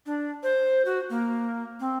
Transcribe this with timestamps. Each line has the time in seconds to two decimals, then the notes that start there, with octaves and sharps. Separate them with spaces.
0.06 D4
0.43 C5
0.85 F#4
1.10 A#3
1.80 C4